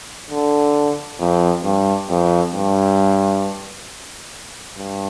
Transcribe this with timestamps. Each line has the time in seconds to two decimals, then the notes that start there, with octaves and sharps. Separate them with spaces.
0.30 D3
1.20 F2
1.64 G2
2.10 F2
2.54 G2
4.79 G2